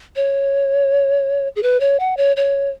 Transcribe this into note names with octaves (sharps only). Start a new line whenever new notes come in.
C#5
G#4
B4
C#5
F#5
C#5
C#5